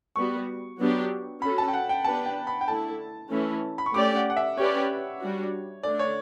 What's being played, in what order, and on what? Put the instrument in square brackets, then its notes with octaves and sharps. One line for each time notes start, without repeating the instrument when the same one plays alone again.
[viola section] G3 B3 F#4 [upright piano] C#6
[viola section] F#3 B3 D4 G4
[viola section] C#4 F#4 A4 [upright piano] B5
[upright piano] A5
G5
F#5
G5
[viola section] B3 D4 G4 B4 [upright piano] A5
[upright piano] G5
B5
G5
[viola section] D3 A3 E4 [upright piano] A5
[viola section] E3 A3 C#4 E4
[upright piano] B5
C#6
[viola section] A3 C#4 G4 D5 [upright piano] D6
[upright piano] F#5
F#5
E5
[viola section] C#4 G4 B4 D5 [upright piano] C#5
[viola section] G3 D4 F#4
[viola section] D3 A3 D4 [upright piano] D5
[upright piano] C#5